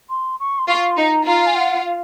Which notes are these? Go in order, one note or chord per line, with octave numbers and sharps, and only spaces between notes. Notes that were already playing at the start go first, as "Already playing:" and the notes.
C6
C#6
C6
F4 C#6
C6
D#4 A#5
F4 A#5
G#5
F#5
F5